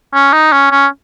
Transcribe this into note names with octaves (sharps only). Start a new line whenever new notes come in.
C#4
D#4
C#4
C#4